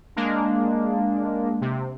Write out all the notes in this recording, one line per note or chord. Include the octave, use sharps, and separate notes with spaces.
G#3 A#3 D4
C3